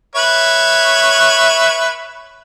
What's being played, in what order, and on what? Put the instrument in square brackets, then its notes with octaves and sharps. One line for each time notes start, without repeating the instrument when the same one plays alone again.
[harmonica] B4 C#5 E5